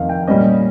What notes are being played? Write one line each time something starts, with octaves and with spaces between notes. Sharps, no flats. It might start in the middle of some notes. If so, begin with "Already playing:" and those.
Already playing: F2 D#3 F5
G5
A#2 G3 C#4 D#5